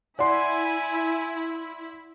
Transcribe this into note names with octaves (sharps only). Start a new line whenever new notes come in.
E4 D5 F#5 G#5 C6